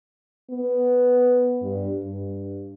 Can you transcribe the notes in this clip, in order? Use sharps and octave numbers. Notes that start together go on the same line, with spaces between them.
B3
G2
G2